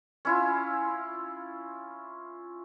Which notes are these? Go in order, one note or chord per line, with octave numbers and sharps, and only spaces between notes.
C#4 E4 F4